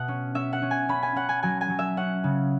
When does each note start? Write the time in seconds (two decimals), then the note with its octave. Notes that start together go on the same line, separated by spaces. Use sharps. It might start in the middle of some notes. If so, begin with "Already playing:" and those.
Already playing: B2 E5 F#5
0.08 C#4
0.35 C#4 E5
0.53 F#5
0.62 C#4
0.71 G#5
0.89 C#4 B5
1.02 G#5
1.15 C#4 F#5
1.29 G#5
1.43 F#3 G#5
1.61 G#5
1.70 F#3
1.79 E5
1.97 C#4 F#5
2.24 C#3